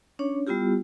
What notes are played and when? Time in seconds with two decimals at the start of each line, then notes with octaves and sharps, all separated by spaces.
0.19 C#4 D4 C#5
0.47 G3 B3 E4 F4 G4